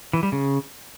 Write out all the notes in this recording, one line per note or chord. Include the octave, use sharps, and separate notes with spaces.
E3
G3
C#3